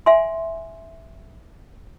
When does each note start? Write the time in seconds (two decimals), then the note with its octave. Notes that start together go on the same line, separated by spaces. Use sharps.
0.06 E5 F#5 G#5 C6